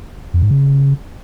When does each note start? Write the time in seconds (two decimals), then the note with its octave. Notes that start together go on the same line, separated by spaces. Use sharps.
0.34 F2
0.42 G#2
0.51 C#3